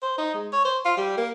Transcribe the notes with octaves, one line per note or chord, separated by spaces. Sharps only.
C5
D#4
G#3
C#5
C5
F4
G3
A#3